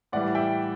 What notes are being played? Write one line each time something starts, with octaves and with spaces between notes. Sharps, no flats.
A2 E3 G3 D5 F#5
E5 G5